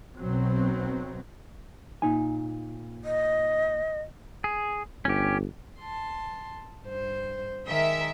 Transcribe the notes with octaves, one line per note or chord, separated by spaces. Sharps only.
B1 B2 F#3 C4
A#2 D#4 G#5
D#5
G#4
G1 C#4 G4
A5 C6
G2 C5
D#3 G#3 A#4 E5